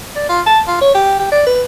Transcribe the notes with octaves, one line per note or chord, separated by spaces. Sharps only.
D5
F4
A5
F4
C#5
G4
G4
D5
B4